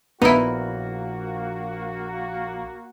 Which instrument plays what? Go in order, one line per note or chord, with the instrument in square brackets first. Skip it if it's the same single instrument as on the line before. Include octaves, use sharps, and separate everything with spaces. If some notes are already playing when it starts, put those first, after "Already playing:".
[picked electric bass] A#1 [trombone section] A#3 F#4 [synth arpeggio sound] B3 [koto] D#4 E4